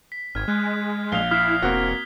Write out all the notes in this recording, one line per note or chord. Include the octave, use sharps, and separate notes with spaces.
B6
G#1 F6 G#6
G#3 F6 F#6 G#6
A#1 F5 F7 G7
E4 D#6 F6 B6 C7
E1 A#3 C4 F#4